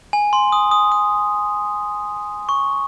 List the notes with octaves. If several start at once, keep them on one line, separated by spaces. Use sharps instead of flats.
G#5
C6
D#6
D#6
D#6
C#6